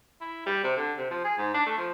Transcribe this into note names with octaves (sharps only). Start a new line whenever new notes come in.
E4
G3
C3
D3
C3
F3
G#4
G#2
D4
A3
F3